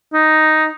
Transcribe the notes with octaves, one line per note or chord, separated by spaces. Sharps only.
D#4